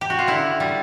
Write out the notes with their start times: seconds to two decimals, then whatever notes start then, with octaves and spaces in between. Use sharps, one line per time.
0.01 G4
0.10 F#4
0.19 F4
0.27 D3 E4
0.60 G3